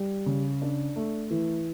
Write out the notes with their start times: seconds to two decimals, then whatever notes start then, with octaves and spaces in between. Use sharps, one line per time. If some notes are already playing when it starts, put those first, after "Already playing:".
Already playing: G3
0.26 C#3
0.62 D4
0.96 A3
1.31 E3